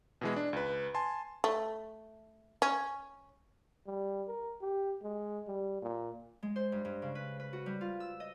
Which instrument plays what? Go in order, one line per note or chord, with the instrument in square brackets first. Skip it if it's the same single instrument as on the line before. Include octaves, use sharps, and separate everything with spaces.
[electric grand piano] B2 E3 G#3
D4
C#2 B4
G#5 A5 C6
[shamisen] A3
C#4
[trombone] G3
A#4
G4
G#3
G3
A#2
[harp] G#3
C5
G2
G2
C#3
B4
B4
F#4
G3
F4
E6
D#5